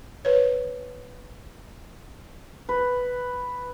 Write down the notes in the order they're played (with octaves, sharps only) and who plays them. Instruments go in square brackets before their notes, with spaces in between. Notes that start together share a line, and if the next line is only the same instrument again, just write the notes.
[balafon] B4 C#5
[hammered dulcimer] B4